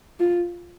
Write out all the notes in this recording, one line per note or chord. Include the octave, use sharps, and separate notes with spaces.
F4